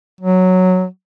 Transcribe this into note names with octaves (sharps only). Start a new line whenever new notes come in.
F#3